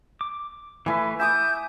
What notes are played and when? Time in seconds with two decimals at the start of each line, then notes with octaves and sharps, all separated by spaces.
0.21 D6
0.86 E3 A3 E4 B4 G#5
1.20 E5 G#5 D6 D#6 G6